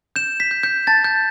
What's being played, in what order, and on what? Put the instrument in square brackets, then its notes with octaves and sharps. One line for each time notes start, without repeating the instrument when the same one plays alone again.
[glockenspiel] G6 E7
B6
G6
G6
A5 A6
G6